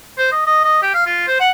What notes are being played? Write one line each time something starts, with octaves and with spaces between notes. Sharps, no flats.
C5
D#5
D#5
D#5
G4
F5
F4
C5
F#5